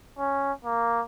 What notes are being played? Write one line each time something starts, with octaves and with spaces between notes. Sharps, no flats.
C#4
A#3